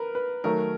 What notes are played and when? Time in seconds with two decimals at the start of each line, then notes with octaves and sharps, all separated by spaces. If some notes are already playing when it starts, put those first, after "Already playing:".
Already playing: A#4 B4
0.15 B4
0.44 D#3 F#3 A3 A#4